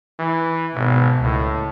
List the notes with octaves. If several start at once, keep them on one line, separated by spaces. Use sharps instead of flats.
E3
G#1 B2
C#2 A2